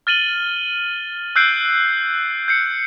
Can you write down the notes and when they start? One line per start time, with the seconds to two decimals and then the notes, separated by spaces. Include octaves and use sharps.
0.07 F6 A6 D#7 F#7 G7
1.36 E6 F#6 G6 C7 D7
2.48 G6 C7 C#7